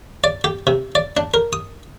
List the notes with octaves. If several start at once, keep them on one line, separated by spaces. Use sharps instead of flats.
D5
G4
C3
D5
D4
A#4
D#6